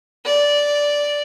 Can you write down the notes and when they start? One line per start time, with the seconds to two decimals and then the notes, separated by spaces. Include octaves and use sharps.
0.25 D5